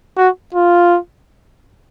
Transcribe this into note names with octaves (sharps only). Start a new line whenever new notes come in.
F#4
F4